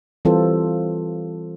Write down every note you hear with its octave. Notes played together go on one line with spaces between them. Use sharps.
E3 G3 C4 F4 A4 C5